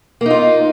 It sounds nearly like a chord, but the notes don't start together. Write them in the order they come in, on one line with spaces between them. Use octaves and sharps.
A#3 D#4 F4